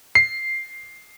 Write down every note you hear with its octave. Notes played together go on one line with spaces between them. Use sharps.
C7